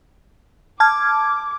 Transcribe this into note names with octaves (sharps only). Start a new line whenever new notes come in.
A5 D6 F6 G#6